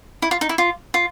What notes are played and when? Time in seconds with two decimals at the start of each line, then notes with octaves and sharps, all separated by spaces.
0.22 E4
0.31 F4
0.41 D#4
0.49 E4
0.58 F4
0.94 F4